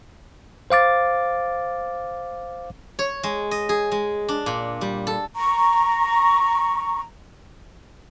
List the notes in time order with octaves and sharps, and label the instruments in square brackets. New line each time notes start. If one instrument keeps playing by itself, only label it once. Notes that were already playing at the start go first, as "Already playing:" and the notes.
[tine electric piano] C5 F5 D6 A6
[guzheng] C#5
G#3
D#5
G#4
G#3
D4
A#2
G3
A4
[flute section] A#5 C#6